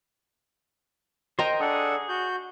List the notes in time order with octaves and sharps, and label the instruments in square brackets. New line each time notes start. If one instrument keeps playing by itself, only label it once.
[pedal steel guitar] A#4 C5 [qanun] D#5 G5 A#5
[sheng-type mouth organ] D4 A4 F#5 [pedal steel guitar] G#4 D#6
[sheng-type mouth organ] F#4 G6